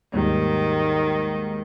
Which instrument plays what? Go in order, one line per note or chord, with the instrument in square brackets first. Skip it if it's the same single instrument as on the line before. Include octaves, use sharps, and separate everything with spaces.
[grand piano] D#2 G#2 G3 [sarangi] D#3